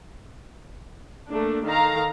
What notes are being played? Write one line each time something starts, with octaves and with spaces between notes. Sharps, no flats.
A3 A#3 D4
D#3 A4 F5 A#5